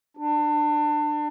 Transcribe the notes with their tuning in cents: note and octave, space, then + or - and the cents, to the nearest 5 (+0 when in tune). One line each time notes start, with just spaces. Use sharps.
D4 +25